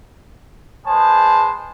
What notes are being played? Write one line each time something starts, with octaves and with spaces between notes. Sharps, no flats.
G#3 G#4 B4 C5 A5